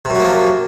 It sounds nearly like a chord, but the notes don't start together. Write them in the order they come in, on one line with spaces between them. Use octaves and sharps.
C3 F#2 F#3 A#3 F3